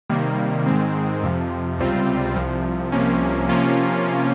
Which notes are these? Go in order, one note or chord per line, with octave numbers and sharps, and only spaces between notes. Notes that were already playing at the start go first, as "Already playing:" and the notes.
C3 D#3 G3 A#3
G#2 D#3 G#3 C4
F2 C3 F3
C#2 C3 G3 C4 F4
C2 C3 F3
C2 C3 F3 A#3 C#4
C3 F3 A#3 C#4 F4